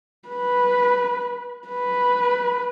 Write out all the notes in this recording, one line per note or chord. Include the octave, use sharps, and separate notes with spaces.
B4
B4